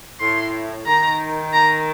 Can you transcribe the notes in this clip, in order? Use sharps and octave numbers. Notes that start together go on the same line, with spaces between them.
A2 C6
D#3 A#5
A#5